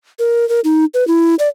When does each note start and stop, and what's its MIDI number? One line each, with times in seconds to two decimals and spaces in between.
0.19 0.47 70
0.49 0.60 70
0.64 0.85 63
0.94 1.07 71
1.08 1.35 64
1.39 1.48 74